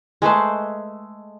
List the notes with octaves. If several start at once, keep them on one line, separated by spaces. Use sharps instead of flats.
G#3 A3 B4 C5